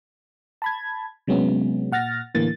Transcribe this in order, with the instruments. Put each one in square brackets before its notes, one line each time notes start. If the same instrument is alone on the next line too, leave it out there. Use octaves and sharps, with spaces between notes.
[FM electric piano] A5 B5 G#6
C3 F#3 G#3 B3 C#4
A#2 F#5 F6 A6 A#6
A2 D3 E3 A#3 A6